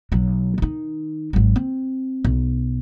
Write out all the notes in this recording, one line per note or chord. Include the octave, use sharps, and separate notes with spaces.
B1 F#3
D#3 D#4
G#1 F#3
C4
B1